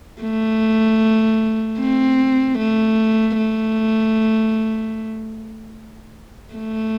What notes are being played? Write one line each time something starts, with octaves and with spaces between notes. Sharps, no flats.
A3
C4
A3
A3
A3